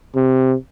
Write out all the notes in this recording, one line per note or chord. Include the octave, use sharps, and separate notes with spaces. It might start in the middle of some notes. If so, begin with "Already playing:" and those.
C3